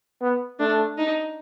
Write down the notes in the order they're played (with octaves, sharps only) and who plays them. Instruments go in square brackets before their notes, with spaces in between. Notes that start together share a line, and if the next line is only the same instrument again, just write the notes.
[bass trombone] B3
[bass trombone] A3 [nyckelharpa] D4
[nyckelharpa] D#4